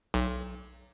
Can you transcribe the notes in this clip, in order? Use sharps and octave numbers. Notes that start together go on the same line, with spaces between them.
B1